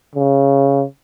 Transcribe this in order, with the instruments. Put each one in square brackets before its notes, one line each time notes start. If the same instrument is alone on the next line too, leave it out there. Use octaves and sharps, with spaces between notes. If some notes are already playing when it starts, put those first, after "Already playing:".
[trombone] C#3